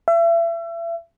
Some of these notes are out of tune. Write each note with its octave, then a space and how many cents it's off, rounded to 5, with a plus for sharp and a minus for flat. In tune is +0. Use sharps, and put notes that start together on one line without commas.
E5 +35